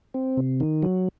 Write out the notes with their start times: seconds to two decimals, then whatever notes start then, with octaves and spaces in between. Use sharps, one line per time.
0.14 C4
0.37 C3
0.60 D#3
0.83 F#3